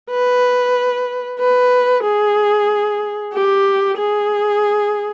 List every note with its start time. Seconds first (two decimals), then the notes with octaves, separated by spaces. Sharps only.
0.11 B4
1.39 B4
2.03 G#4
3.33 G4
3.97 G#4